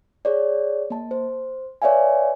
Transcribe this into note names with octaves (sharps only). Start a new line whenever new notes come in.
G#4 C#5 D5
A#3 A5
C5
B4 C#5 D5 E5 F5 G#5